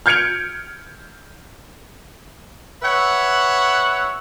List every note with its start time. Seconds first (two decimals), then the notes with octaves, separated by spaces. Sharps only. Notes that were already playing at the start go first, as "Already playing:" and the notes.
0.06 F6 G6 G#6 C#7 D7 F7
2.82 B4 C#5 E5 F#5